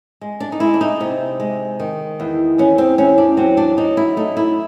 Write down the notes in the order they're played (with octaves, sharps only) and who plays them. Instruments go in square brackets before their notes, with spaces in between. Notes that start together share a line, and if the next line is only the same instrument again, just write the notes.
[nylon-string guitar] G#3
D4
D#4
G#3 E4
D4
D#4
C3
G#3
D#3
E2
E2 C#4
C4
E2 C#4
D4
F#3 C4
D4
F#3 D#4
E4
A3 D#4
E4